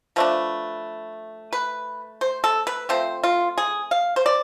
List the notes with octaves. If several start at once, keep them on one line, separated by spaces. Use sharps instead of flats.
F3 A3 D4 B4
B4
C5
A4
B4
F3 A3 C4 C5
F4
G#4
F5
C5
D5